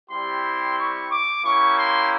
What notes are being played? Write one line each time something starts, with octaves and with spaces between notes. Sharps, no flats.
G3 C4 E4 G4 C6
C#6
D6
A#3 C#4 E4 G4 C#6
C6